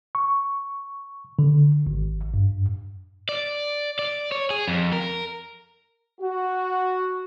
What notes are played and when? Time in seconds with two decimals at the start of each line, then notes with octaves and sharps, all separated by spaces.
0.15 C#6
1.39 D3
1.87 G#1
2.34 G2
3.29 D5
3.99 D5
4.32 C#5
4.50 G#4
4.68 F2
4.93 A#4
6.20 F#4